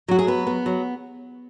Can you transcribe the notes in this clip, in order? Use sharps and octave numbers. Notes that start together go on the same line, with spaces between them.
F#3 F#4
G#4
B3 B4
B3
F#3